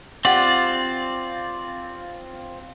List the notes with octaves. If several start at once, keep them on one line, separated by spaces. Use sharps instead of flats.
C4 F4 G4 D5 F#5